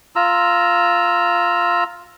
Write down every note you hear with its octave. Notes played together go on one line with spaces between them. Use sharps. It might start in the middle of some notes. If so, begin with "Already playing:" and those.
F4 A#5 E6